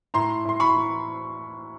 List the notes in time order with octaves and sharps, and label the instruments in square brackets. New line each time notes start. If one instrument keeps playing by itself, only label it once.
[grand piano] A2 A#5 C6
A2 C6
B5 C#6
E3